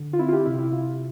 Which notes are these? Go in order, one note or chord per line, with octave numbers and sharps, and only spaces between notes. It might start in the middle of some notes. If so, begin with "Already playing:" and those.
Already playing: D3
F4
C4 E4
F4
G4
C3 E4
E4
C3 F4